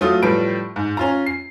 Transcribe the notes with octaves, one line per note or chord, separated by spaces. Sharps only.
F#3 A3 F4 D#6
A2 F3 G3 B4 D7
G#2
C#4 F4 A#5
C7